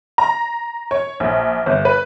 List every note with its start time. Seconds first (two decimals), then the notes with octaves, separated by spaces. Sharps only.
0.18 A#5
0.91 C#5
1.20 A#1
1.66 G1
1.85 B4